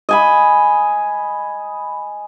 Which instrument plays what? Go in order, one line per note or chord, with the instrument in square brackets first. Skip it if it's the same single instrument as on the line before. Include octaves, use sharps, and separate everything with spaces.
[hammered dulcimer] D#5 G#5 B5